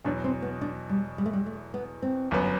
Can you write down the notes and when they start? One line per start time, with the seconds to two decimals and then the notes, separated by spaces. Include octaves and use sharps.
0.05 E2 B2 F#3 D4
0.24 C4
0.42 B3
0.61 D4
0.89 G3
1.18 G3
1.26 A3
1.33 G3
1.46 A3
1.74 B3
2.02 C4
2.31 G1 F#2 F#3 B3